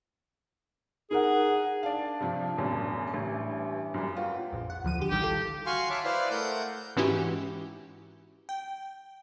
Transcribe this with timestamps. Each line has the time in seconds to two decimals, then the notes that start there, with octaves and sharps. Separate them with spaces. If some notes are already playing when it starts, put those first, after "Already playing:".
1.11 D#4 G#4 A#4 F#5
1.83 D4 D5 F5
2.21 G2 C3 F3
2.57 E1 A1 F#2
3.14 A1 G2 E3
3.94 F#2 G3
4.15 A#3 F4 F#4 B4 G5
4.52 A#1 F2
4.70 F#5
4.84 D2 F3 D#7
4.99 D3 G4
5.11 A1 D#3 G3 G4
5.22 F4 A4
5.66 F#4 F5 G#5 C6 C#6
5.90 C#5 E5 F5 A5 B5 D6
6.05 E4 B4 C5 D5 F5
6.31 A3 A#4 F#5 G6
6.96 G#2 E3 C#4 E4 F#4 G4
8.49 G5